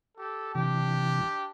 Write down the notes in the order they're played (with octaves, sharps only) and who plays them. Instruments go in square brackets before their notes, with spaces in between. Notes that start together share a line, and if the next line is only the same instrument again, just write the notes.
[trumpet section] G4 A4
[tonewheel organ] C3 E3 [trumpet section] D4 G4